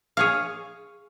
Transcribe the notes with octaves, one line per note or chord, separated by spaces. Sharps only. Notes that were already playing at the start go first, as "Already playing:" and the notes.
G#4 C#5 F5